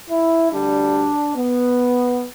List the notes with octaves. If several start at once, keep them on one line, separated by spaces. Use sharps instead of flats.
E4
D2 D3 G3 D4
B3